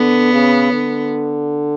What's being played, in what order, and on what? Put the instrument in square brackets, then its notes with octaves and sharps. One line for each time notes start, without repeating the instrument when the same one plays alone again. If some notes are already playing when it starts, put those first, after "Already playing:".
Already playing: [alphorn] D3 [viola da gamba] B3
[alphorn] C#3
D3